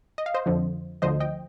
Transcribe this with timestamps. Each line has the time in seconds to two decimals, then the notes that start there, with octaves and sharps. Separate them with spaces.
0.18 D#5
0.26 F5
0.34 C5 D#5
0.46 F2 D3 F3
1.02 D2 D3 F3 C5 D#5
1.20 D#5 G5